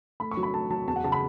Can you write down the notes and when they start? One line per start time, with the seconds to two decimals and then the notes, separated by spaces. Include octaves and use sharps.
0.20 A3 B5
0.31 C#6
0.37 F#3
0.43 B5
0.53 A3 A5
0.70 F#3 A5
0.88 E2 A5
0.96 F#5
1.04 C#3 A5
1.12 B5